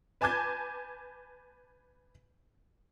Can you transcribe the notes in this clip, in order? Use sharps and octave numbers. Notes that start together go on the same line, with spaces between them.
B4 G#5 A5 D6 G6 G#6